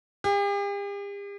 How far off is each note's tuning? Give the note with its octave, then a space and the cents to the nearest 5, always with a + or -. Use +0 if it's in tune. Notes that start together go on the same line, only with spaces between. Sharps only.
G4 +45